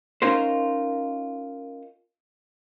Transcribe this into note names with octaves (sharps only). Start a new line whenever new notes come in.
C#4 D#4 F4 A#4 C5